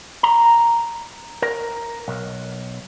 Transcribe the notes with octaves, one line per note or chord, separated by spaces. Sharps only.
A#5
A#4
B1